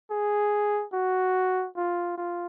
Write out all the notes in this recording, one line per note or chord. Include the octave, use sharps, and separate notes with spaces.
G#4
F#4
F4
F4